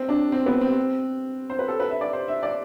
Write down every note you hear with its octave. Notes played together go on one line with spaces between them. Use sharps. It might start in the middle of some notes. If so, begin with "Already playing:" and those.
Already playing: C4
D4
C4
B3
C4
C5
B4
A4
B4
E5
D5
C5
E5
D5